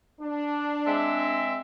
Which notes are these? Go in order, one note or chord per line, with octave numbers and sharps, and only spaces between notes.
D4
G#3 C4 E5